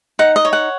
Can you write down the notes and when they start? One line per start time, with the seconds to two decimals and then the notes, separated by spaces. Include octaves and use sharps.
0.19 D#4 F#5
0.36 D#5
0.45 C#5
0.53 F#5